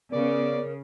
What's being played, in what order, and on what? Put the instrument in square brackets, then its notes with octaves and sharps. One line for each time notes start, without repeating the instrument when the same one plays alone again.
[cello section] C#3 [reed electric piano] B3 [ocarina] A#4 [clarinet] D5